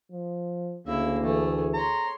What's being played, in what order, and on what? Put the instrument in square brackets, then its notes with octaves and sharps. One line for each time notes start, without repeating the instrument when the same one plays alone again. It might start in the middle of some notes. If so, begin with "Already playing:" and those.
[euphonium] F3
[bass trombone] D2 [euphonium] C#3 [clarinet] A#3 [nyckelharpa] E4 E5
[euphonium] E3 [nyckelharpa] A3 G#4
[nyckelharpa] C#5 C6 [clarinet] A#5